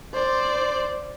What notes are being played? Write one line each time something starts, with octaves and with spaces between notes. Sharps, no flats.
C5 D5